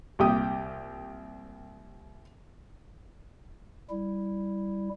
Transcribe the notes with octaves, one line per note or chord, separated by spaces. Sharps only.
C2 A#2 G4 G5 D#6
G3 E4